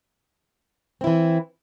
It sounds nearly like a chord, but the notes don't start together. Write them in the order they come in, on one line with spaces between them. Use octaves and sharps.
C4 E4 E3